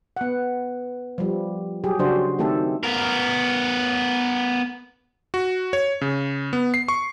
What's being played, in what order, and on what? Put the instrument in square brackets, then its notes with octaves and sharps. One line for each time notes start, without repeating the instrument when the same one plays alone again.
[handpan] B3 F#5
F3 G3
F#3 G4 G#4
C#3 F#3 D4 F#4 C5
D#3 A3 C4 G4 A4
[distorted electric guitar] B3 A#4
[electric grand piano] F#4
C#5
C#3
B3
C7
C#6